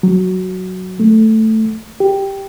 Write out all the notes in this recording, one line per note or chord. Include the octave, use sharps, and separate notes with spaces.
F#3
A3
G4